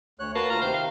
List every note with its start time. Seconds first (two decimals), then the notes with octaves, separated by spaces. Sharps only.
0.19 D2 C#5 F#6
0.35 A#3 F#4 B4 A5
0.50 D2 F4 A#5 F6
0.62 C3 D#3 C5
0.74 F5